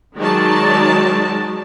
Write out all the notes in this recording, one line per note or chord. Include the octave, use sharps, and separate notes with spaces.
D#3 F#3 G#3 D#4 D5 A5